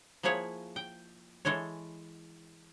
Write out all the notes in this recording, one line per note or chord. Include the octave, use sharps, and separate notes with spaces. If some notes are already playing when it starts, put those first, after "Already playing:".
F3 A#3 E4 G#4 C#5 F#5
G5
E3 G#3 A4 C#5